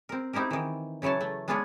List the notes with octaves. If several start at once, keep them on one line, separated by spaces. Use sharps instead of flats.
C4 A#4
C4 D#4 E4 G4 A#4
D#3 E3
C#3 E3 F#3 C#5 A5
A3
G#3 B3 D4 F4 G#4 C#5